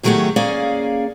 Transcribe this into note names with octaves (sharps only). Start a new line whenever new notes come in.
A2 D#3 F#3 A3 G4 G#4
A#3 C#4 G#4 D5 F5